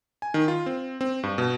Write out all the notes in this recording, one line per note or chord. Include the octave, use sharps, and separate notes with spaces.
G#5
D#3
F4
C4
C4
G2
B2